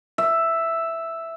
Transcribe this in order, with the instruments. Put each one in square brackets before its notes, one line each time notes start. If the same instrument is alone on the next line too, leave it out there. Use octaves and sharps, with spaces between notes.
[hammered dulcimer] E5